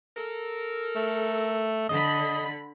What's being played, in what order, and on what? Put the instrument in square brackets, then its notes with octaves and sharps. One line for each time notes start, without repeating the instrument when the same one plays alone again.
[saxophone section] A4 A#4
[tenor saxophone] A3
[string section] D3 B5 [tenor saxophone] D#5